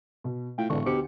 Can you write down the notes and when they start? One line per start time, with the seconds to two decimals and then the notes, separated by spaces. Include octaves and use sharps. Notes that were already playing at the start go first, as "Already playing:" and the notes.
0.24 B2
0.58 A2 F4 G5
0.70 E1 A1 D3 C#6
0.86 D2 B2 G4 C5 C#7